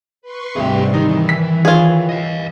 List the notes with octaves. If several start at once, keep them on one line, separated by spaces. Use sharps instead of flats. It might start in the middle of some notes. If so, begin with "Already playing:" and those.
B4 C6 C#6
G#1 D2 G#2 C3 G3 G#4 G5
D#3 E3 D#4
B6
F4 G#4 C#5
D#5 F5